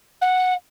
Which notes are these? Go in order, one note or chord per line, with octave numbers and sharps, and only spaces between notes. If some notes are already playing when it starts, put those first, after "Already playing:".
F#5